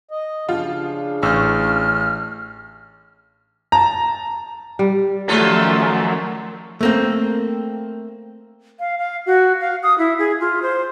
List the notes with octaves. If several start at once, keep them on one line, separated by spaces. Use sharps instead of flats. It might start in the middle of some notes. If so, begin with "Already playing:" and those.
D#5
C#3 F3 D4 F4
A1 C#6 E6 F6 G6
A5 A#5
G3
F#2 D#3 F3 A3 C#4 F4 A4
A3 A#3 C4
F5
F5
F#4
F5
D#6
E4
G#4
F4
C5